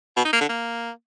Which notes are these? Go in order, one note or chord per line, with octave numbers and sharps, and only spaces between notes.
B2
D#4
A#3
D3
A#3